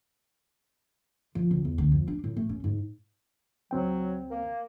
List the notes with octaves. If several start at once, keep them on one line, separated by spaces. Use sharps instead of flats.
F3
C#2
E2
D2
F2
D4
A2
A3
C#4
G#2
C#2 F#3 C4 G5
A#3